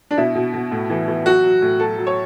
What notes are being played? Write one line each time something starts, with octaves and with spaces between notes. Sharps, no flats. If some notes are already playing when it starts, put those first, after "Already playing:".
D4
B2 E4
B2
B2
A2
E3
E3
F#3 F#4
F#3
A2
F#3 A4
F#3
C#5